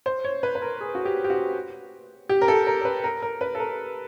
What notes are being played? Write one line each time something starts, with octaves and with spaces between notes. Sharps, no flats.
C5
C#5
B4
B4
A#4
G#4
F#4
G4
G4
F#4
G4
A#4
A4
A#4
A#4
B4
A#4
A#4
B4
A4
A#4